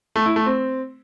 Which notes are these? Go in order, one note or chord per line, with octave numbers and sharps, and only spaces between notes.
A3
E4
A3
C4